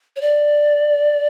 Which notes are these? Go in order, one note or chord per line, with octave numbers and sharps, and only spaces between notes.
C#5
D5